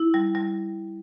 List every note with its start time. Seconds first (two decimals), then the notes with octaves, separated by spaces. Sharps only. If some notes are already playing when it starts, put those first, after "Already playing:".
Already playing: E4
0.14 G3
0.35 G3